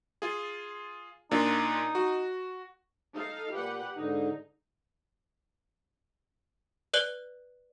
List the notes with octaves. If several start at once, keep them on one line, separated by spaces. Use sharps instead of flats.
F4 G#4
A#2 D4 D#4 F4
F#4
D#4 A4 F5
A#2 G4 B4 F#5
G#2 D3 D#4
B4 D5 F#6 F#7 G7